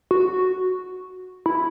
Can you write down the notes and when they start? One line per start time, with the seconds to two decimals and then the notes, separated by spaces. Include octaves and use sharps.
0.11 F#4
1.46 E4